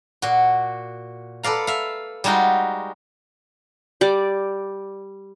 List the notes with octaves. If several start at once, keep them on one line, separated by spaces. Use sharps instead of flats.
A#2 F#4
A4 B4 D5 F5 A#5
E5 F5
G3 G#3 D#4 F4 F#4
G3 D5